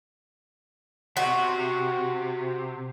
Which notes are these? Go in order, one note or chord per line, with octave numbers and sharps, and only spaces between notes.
C3 F#4